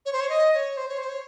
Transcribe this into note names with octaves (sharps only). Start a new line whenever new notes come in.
C#5
C5
C#5
D#5
C#5
C5
C#5
C5
C#5